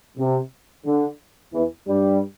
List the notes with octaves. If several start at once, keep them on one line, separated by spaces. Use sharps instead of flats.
C3
D3
E2 E3
G2 G3